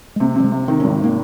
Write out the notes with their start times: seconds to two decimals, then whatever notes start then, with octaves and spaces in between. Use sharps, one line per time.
0.16 G#3
0.20 C3 A#3
0.36 C3 G3
0.44 G#3
0.52 C3
0.68 D#3 C4
0.80 C#4
0.84 G#1
1.00 D#3 A#3